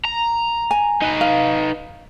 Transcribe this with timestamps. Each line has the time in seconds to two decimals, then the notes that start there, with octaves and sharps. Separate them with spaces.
0.05 A#5
0.71 G#5
1.02 D#4 B4
1.21 F5